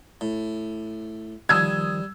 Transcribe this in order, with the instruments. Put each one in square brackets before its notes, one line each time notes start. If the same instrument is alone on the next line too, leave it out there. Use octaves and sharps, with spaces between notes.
[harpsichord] A2
[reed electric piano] D#3 F3 [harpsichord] G3 [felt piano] D#6 E6 G#6